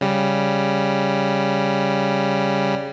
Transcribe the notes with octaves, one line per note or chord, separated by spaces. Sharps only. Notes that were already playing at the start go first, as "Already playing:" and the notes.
C#3 G3